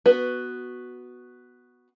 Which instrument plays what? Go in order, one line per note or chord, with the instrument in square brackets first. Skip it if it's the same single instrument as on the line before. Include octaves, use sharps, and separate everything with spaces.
[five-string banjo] B3 F#4 B4